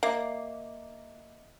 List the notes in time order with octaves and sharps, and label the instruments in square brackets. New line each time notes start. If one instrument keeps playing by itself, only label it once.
[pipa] A#3 [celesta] D#5 E5 D6